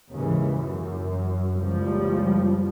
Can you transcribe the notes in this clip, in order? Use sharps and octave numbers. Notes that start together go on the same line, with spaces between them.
D#2 G#2 C#3 E3
F#2
F#1 C#2 F3 G3